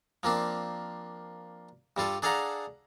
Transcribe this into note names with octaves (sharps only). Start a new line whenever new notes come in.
F3 A#3 C4 D4
G2 G3 F4 A4
D4 G#4 A4 F5 F#5 A#5